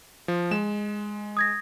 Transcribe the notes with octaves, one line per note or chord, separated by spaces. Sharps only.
F3
G#3 E7
D#6 G#6 A#6